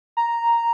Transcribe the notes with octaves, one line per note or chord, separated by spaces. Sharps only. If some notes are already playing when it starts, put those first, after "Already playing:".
A#5